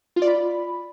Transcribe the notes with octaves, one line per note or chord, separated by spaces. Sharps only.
F4
D5
B5